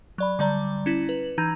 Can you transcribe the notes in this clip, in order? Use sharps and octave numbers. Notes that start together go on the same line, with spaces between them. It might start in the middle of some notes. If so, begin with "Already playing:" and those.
F#3 D5 B5
D3 G3 D5 A#5
C#4 E4
B4
E3 D#4 A#5 G6 G#6